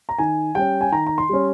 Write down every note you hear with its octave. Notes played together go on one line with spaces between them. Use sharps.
A#5
D#3 G#5
G3 C#4 G5
G#5
D#3 A#5
A#5
C6
G3 C#4